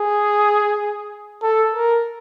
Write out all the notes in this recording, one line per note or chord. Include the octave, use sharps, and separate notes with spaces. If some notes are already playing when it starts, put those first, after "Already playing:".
Already playing: G#4
A4
A#4